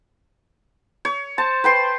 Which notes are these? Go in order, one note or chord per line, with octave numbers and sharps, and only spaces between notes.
C#5
C5 A5
B4 G5 C6